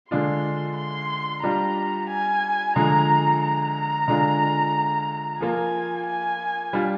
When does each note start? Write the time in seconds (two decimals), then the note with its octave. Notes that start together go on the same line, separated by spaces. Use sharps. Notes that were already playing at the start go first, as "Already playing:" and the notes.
0.10 D3 G#3 D4 F4 C6
0.77 C6
1.43 G3 D4 F4 A#5
2.10 G#5
2.76 D3 F3 G#3 A#5
3.42 A#5
4.08 D3 G#3 D4 F4
5.41 F3 A#3 F4 G#5
6.07 G#5
6.73 G3 D4 F4